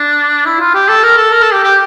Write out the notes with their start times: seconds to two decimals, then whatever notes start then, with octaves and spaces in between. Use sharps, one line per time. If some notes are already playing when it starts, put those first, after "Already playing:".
Already playing: D4
0.46 E4
0.60 F4
0.74 G4
0.89 A4
1.03 A#4
1.17 A4
1.32 A#4
1.42 A4
1.53 G4
1.64 G4